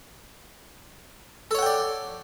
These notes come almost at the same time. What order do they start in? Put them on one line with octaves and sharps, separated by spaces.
A4 C#5 F#5 G5 D5